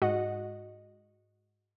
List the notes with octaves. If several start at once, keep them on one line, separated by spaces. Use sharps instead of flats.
G#2 F#4 D#5 F#5